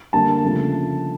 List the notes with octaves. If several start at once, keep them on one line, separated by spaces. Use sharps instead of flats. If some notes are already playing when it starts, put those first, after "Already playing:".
D3 G3 A#3 A5
C#3 F3 A3